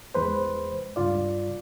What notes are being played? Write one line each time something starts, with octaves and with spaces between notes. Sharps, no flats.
E2 G#3 B4 C5
C#2 G2 F4 D5